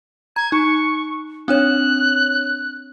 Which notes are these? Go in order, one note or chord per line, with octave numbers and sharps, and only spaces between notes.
A#5 G#6
D#4 C#6
C4 D4 C#5 F#6